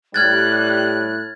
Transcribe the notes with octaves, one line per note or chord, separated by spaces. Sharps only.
A2 G3 F6 F#6 G#6 A6